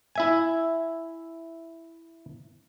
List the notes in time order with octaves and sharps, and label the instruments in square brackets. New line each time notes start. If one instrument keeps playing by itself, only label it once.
[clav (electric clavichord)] E4 E5 G#5